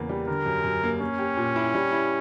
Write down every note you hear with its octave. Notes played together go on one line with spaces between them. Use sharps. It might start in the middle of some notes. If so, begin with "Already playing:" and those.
Already playing: E2 C#3 A#3
G3
D3 A#4
F#2
F#2
A#3
A#3 C#4
G4
A#2
E4
G3
E4